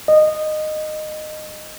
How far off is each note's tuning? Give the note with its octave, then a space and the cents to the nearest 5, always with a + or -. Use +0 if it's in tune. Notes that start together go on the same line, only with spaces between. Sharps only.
D#5 -15